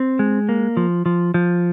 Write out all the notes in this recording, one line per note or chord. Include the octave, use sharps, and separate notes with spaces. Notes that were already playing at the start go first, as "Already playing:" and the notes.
Already playing: C4
G#3
A#3
F3
F3
F3